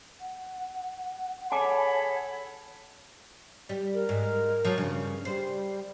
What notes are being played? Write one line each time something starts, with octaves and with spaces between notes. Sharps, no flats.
F#5
G#4 A4 C#5 G#5 A5 B5 D6
G3
A#4
G#2
F3 F#3
G2 C#3
G3 C5